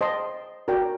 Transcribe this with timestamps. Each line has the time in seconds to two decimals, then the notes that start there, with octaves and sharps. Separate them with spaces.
0.01 C5 D#5 A5 C6
0.68 F#4 A#4 D5 G5 A#5